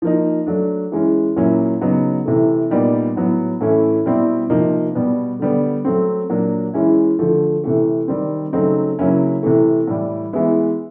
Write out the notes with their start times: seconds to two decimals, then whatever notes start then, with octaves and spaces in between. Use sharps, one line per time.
0.02 F3 A#3 D#4
0.46 F#3 A3 D4
0.92 E3 G#3 C#4
1.36 A#2 F#3 A#3 C#4 E4
1.81 C#3 F#3 B3 D#4
2.26 C3 E3 A3
2.70 A#2 G3 B3 D#4
3.16 A2 F#3 B3
3.61 A2 E3 A3 C#4 E4
4.06 B2 G3 C4 E4
4.50 C3 F3 A#3 D#4
4.95 B2 G3 B3
5.39 D3 G3 B3
5.85 F#3 A3 C4
6.29 A#2 F#3 A#3 D4
6.74 E3 G#3 C#4 E4
7.19 D3 F3 A3
7.64 C3 E3 A3
8.08 D#3 G3 C4
8.53 C#3 F#3 A3 C4 D#4
8.99 C#3 F#3 A#3 C#4 E4
9.43 C3 E3 A3
9.87 A2 E3 G3
10.33 E3 G#3 B3 E4